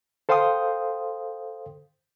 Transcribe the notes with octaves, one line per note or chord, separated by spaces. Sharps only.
A4 C5 F5 G5 C6 D#6